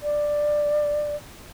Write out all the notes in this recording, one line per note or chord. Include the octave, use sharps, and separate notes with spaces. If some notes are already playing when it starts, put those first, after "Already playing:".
D5